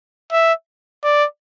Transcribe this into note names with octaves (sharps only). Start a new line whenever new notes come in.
E5
D5